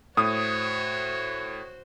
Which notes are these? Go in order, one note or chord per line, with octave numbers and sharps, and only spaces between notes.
A2 F#4 C5 C#5 D#6